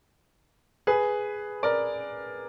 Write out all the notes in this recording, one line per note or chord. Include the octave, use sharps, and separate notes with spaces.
G#4 B4
A#4 D5